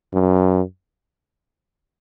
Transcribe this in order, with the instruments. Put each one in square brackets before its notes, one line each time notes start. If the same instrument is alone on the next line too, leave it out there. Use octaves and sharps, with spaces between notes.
[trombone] F#2